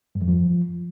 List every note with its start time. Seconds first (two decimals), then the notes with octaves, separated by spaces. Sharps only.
0.15 G2
0.22 F2
0.28 F3